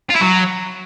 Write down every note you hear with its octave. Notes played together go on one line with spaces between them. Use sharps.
F4
E4
F#3